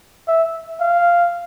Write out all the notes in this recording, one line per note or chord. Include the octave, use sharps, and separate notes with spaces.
E5
F5